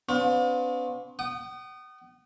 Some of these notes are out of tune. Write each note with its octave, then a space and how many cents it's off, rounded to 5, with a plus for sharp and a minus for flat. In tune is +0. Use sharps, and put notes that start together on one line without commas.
B3 +45 D4 -45 F4 +40
F#5 +45 D#6 -20